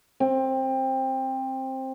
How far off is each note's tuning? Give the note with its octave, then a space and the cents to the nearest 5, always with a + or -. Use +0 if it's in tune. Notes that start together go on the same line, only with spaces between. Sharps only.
C4 +15